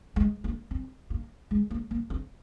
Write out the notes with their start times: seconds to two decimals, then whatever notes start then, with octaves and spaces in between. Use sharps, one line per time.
0.16 G#3
0.44 A#3
0.71 C4
1.10 A#3
1.51 G#3
1.71 A#3
1.91 A#3
2.10 C4